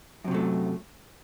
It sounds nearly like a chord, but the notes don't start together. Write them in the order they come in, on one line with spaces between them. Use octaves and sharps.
F#2 C3 F#3 A3